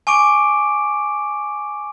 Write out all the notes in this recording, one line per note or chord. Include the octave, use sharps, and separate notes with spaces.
G#5 C#6 D6 D7